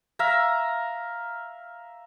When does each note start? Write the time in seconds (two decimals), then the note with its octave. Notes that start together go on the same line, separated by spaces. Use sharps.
0.19 E5 F5 A#5